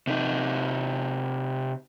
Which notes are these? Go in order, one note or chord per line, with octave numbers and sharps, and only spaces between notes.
C3 D#4